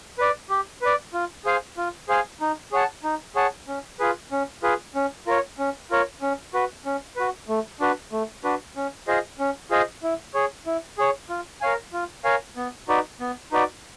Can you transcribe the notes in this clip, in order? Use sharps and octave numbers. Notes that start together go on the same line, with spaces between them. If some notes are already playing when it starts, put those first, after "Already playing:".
B4 D5
G4
B4 D5
F4
G#4 C5 F5 G#5
F4
G#4 C5 F5 G#5
D#4
G#4 C#5 F#5 A5
D#4
G#4 C#5 F#5 A5
C#4
F4 G#4 B4
C#4
F4 G#4 B4
C#4
F4 A#4 C#5
C#4
F4 A#4 C#5
C#4
F#4 B4
C#4
F#4 B4
A3
D4 F#4 B4
A3
D4 F#4 B4
C#4
F4 G#4 C5 D#5
C#4
F4 G#4 C5 D#5
E4
G#4 C#5
E4
G#4 C#5
F4
A#4 C#5 F5 G#5
F4
A#4 C#5 F5 G#5
B3
D#4 F#4 B4 D5
B3
D#4 F#4 B4 D5